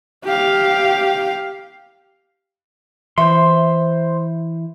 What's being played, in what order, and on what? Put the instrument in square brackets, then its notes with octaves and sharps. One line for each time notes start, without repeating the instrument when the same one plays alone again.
[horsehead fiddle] G4 F5
[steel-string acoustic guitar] E3 E5 [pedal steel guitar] C5 C6